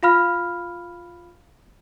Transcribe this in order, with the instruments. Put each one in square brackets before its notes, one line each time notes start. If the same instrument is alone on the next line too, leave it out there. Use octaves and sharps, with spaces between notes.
[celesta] F4 F5 B5 F6